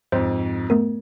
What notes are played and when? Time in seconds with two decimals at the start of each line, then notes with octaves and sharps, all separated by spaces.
0.12 F2 G#2 C5
0.70 A3 B3 A#4